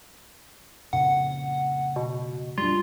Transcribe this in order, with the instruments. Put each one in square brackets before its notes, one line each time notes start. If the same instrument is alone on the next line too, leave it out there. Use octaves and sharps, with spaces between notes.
[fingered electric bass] F2 A#2 C#3 [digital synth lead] F#5
[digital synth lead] B2
[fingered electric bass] G3 D4 [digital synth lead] F4